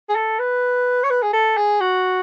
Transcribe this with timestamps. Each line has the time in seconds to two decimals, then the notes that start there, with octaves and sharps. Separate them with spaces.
0.09 G#4
0.16 A4
0.39 B4
1.03 C#5
1.10 B4
1.23 G#4
1.33 A4
1.57 G#4
1.81 F#4